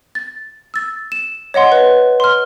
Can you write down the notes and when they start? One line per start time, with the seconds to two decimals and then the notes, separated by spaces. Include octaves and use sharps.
0.15 A6
0.74 E6 A6
1.12 E7
1.54 C#5 D#5 F#5 C6
1.72 B4
2.20 C6 F6